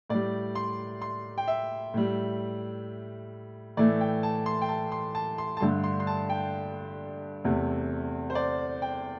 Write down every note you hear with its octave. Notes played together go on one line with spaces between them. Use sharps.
A2 G3 D5
C6
C6
G5
E5
A2 G3
A2 E3 A3 D5
G5
A5
C6
G5
A5
C6
A5
C6
A5
G2 D3 A3 C6
C6
C6
A5
G5
E2 C3 A3
C5
D5
G5